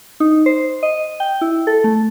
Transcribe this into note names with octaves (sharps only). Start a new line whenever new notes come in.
D#4
C5
D#5
G5
E4
A4
A3